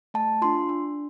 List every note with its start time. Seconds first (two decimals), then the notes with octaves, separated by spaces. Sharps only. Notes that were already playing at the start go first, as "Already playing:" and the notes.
0.14 A3 A5
0.42 D4 F4 C6
0.69 D4